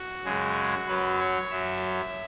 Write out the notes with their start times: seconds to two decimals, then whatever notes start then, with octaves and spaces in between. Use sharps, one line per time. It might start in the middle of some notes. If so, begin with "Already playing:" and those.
Already playing: F#4
0.24 F#2 C#3 G#3
0.87 F#2 F#3 B4
1.19 C#5
1.51 F#2 F#3 E5